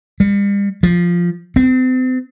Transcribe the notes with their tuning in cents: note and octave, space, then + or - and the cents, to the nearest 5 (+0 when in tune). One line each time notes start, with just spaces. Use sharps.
G3 +40
F3 +0
C4 -35